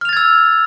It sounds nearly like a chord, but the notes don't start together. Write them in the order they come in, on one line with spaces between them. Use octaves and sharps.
F6 F7 A6 G#6 E6